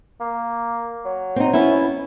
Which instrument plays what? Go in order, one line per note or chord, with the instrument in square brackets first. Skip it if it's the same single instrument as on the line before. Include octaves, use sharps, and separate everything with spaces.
[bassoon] A#3
F#3
[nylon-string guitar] C4 D#4
B3 C#4 E4